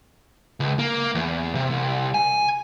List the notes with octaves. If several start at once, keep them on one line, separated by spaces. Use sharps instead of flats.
C#2
A#3
E2
C3
C2
G#5